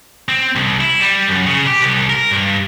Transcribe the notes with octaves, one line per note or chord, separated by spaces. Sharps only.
C4
C2
E4
G3
F#2
C#3
G4
C2
A#4
G2